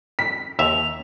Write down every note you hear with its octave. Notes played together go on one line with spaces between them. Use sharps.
B6
D#2 E5 F7